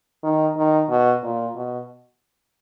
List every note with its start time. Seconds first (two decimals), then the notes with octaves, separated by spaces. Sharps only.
0.23 D#3
0.57 D#3
0.89 B2
1.23 A#2
1.55 B2